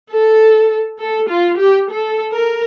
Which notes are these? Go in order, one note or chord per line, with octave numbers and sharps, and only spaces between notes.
A4
A4
F4
G4
A4
A#4